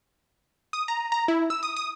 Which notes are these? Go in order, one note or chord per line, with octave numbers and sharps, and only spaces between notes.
D#6
A#5
A#5
E4
E6
D#6
D#6